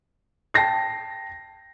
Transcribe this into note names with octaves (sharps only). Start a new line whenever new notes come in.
G5 A5 A#6 C7